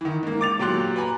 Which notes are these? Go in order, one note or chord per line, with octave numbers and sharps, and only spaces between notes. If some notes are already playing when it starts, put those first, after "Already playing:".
D#3 E3
G#2 A#3
D6 A6 F7
A#2 F#3 G4 G5 C6 F#6
B4 G#5 A#5